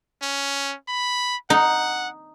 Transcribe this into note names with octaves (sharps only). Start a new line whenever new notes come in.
C#4
B5
D#4 F#5